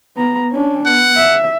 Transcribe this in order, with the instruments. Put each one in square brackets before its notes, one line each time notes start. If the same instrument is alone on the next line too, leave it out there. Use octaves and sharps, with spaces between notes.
[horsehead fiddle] B3 A#5
C#4 D4
[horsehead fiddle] B3 [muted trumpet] F#5
[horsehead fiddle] E5